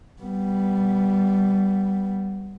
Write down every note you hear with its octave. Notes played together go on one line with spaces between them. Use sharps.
G3 B3